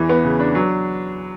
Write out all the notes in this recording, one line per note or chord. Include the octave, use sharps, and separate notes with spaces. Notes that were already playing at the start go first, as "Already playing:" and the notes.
Already playing: E2 E3
B3
C#3
D4
F#3